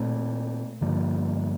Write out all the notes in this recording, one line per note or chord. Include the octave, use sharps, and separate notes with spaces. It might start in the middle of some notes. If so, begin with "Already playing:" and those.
Already playing: A#2 A3 C4
G2 D3 F3 A#3